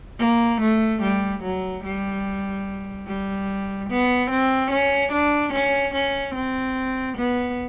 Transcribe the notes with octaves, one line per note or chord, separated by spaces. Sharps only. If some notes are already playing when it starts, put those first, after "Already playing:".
A#3
A3
G3
F#3
G3
G3
B3
C4
C#4
D4
C#4
C#4
C4
B3